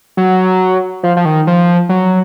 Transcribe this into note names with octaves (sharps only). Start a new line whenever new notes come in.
F#3
F3
F3
D#3
F3
F#3